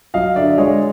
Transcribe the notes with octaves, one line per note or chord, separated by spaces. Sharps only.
F#3 D#5 F5
D3 D5 E5
G#3 C#5 D#5